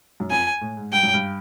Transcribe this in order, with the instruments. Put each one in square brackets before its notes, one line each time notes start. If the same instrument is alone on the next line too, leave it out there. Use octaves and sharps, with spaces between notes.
[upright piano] F#2
[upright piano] F2 [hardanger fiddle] G#5
[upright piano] A2
G#2
[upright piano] G2 [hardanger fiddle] G5
[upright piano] F#2
G2